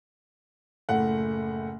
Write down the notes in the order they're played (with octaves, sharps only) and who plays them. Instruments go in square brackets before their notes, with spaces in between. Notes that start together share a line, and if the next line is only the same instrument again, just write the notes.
[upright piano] F#1 A2 A3 F#5